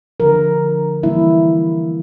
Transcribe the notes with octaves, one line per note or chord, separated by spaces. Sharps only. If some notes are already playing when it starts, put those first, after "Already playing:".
D3 F3 A3 A#4
E3 G3 A#3 E4